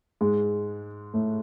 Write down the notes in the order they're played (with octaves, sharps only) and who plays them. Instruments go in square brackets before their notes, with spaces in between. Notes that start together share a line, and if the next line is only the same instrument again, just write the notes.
[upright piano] G#2 G#3
A2 A3